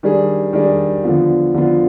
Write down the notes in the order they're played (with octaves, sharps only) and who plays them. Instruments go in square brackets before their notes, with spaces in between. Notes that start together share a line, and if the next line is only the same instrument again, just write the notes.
[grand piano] D#3 G3 D4 G#4
D#3 G3 D4 G#4
D3 F3 B3 F4
D3 F3 B3 F4